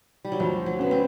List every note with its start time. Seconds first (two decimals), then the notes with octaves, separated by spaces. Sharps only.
0.25 G3
0.32 F#3
0.40 D2 F3
0.66 F#3
0.79 C#3 B3
0.91 C4